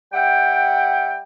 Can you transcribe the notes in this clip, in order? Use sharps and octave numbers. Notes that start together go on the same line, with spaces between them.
G3 E5 F#5 G5